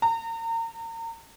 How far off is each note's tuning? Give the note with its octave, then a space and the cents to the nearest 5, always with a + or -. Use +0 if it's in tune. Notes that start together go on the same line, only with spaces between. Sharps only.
A#5 -35